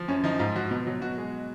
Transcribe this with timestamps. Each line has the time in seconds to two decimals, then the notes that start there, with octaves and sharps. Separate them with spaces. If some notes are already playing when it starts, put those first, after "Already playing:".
Already playing: F3
0.08 F#2 C#4
0.24 F3 D#4
0.39 G#2 F4
0.56 F3 F#4
0.71 B2
0.87 F#3
1.01 B2 F#4
1.18 G#3